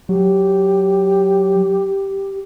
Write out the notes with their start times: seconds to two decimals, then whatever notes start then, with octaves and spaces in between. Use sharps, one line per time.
0.09 F#3 G4